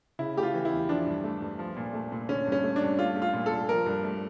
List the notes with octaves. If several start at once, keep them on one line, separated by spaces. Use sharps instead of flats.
C#3 E4
A3 G4
F4
E3
E4
E2
F3 D4
G2
A3
G2
F3
A#2
A3
A#2
D3 C#4
G2 C#4
A3
D4
G2
A3 F4
A3
F4
A#2
A4
A#2
F3 A#4
G2
A3